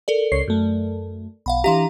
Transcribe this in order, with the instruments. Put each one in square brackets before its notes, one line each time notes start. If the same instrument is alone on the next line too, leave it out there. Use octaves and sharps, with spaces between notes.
[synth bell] A4 A#4 D5
[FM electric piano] C#2 C#5 C7
F#2 A3
[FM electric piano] B1 [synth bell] F5 F#5 B5
[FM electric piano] E3 D4 A#5 [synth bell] G4 F5 C6